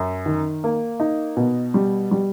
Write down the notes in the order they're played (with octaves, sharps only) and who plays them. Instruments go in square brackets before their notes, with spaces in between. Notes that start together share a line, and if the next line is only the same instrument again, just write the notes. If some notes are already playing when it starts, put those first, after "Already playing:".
Already playing: [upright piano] F#2
D#3
A#3
D#4
B2
G3
G3